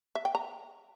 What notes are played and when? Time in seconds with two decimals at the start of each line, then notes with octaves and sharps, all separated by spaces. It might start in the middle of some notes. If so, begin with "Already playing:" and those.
0.15 E5
0.25 G5
0.35 A#5